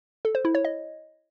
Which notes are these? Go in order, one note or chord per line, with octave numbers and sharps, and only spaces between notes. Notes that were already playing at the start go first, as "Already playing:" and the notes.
A4
C5
E4
C#5
D#5